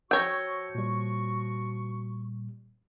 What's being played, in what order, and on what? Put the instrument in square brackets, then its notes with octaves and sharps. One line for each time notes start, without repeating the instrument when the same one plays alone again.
[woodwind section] F3 F#4 C#6 [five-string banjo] C#5 G5 [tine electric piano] E6 G6 A#6
[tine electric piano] A#2 G3